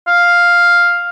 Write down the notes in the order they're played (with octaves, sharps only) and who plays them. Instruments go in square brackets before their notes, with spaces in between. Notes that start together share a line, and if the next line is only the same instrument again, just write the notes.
[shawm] F5